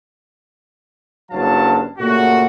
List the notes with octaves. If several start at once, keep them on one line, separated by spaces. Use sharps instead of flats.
F#1 G2 F#3 F5 A5
A#2 C#3 A3 F#4